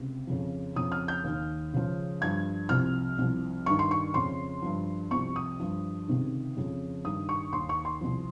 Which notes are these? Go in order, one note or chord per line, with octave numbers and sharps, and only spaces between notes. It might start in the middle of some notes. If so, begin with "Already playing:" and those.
Already playing: C#2 C3
F2 C#3 F3
F2 C#3 F3 D#6
F6
G6
D#2 D#3
C#2 C#3 F3
G2 F3 G#6
C2 C3 F3 F6
C2 C3 F3
G2 D#3 C#6
C6
C#6
F2 C#3 F3 C6
G2 F3
C2 C3 F3 C#6
D#6
G2 F3
C#2 C3 D#3
F2 C#3 F3
G2 D#3 D#6
C#6
D#2 D#3 C6
C#6
C6
C2 C3 F3